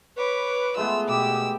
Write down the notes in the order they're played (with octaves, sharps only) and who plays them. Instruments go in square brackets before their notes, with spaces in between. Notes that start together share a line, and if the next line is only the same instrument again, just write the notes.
[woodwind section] B4 [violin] C#5 D6
[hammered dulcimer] G#3 A3 B3 [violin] F4 E6
[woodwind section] B2 D6 [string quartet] G4 [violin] E6